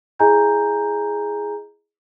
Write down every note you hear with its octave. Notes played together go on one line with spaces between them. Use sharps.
E4 G#4 D#5 G#5 A#5 G6